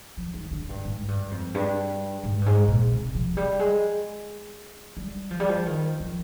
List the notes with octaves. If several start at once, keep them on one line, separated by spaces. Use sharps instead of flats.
F3
D#3
D3
G2
G#2
G2
F2
G2
G#2
G2
G#2
A#2
C3
F3
G3
G#3
G3
F3
G3
F3
D#3
F3